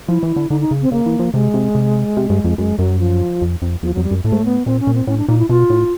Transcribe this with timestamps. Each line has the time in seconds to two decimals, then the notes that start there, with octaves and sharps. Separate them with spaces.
0.08 F3 E4
0.23 E3
0.36 D3
0.50 D3 D#4
0.61 D#4
0.71 C#3
0.82 C4
0.92 C#3 A#3
1.06 E3
1.19 F3
1.33 C3 G#3
1.54 C3
1.75 C3
2.17 C3
2.30 G2
2.44 F2
2.58 F#2 G#3
2.79 F#2 F#3
2.99 F3
3.42 F2
3.62 F2
3.83 E2 F3
3.94 F2 F#3
4.04 G3
4.11 F#2
4.24 A2 A3
4.32 G#2
4.39 A2
4.45 B3
4.66 A#2 C4
4.80 C#4
4.87 A#2
4.94 C4
5.07 A2 C#4
5.18 D4
5.29 A#2 D#4
5.38 E4
5.49 B2 F4
5.70 A2